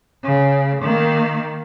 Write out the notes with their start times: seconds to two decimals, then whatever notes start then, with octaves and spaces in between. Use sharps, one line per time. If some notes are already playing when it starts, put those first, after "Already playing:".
0.24 C#3
0.83 D#3 A#3